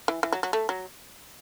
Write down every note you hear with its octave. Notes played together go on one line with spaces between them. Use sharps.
E3
E3
F#3
F#3
A3
F#3